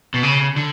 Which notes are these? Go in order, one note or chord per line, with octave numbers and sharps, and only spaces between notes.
B2
C#3
D3